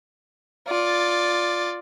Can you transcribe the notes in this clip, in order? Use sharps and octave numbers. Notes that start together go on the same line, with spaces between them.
F4 D5